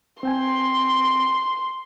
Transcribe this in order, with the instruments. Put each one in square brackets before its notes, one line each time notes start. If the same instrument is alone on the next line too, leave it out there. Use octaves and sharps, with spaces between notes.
[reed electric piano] C4 G5 G#5 [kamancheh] C6